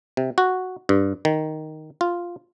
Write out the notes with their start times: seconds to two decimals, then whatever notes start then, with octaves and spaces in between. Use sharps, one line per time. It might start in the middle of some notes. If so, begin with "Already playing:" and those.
0.17 C3
0.38 F#4
0.89 G2
1.25 D#3
2.01 F4